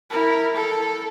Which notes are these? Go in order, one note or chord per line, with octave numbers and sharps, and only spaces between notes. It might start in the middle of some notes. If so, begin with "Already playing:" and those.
E4 A#4
A4